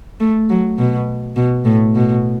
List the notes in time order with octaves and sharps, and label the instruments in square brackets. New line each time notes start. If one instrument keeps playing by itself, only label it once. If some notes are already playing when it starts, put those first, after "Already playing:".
[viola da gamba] A3
F#3
B2
B2
A2
B2